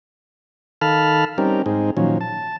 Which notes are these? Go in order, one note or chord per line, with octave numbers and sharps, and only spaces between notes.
D#3 A4 F5 A5 B5 F6
G3 C4 C#4 D#4 G4 A#4
G#2 C4 D#4 G#4
A#2 D#3 F3 F#3 C#4
A5